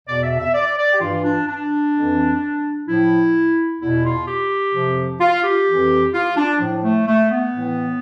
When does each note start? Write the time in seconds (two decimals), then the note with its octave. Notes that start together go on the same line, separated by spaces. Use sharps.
0.08 E2 B2 D5
0.23 E5
0.39 E5
0.54 D5
0.78 D5
0.92 G4
1.00 G2 E3 F4
1.24 D4
1.47 D4
1.94 F2 E3
2.87 A2 F3 E4
3.80 E2 B2 E4
4.04 F4
4.27 G4
4.74 F2 C3 F3
5.20 F4
5.43 G4
5.67 F2 E3
6.13 F4
6.37 D4
6.60 A2 F3
6.83 A3
7.06 A3
7.30 B3
7.53 A2 E3